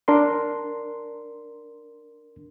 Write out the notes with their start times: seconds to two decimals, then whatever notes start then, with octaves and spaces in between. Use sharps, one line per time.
0.08 D4 A#4 C6